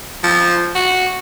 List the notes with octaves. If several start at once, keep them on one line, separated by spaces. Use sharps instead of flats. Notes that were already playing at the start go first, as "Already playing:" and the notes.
F3
F#4